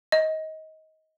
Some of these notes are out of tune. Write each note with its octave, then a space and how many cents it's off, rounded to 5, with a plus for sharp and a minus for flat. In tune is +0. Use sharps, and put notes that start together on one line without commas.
D#5 +20